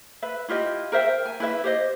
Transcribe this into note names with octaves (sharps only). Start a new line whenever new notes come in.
B4 E5
E4 F4 G4 D#5
A#4 C5 E5 G5
G#5
E4 B4 E5
G4 C5 D#5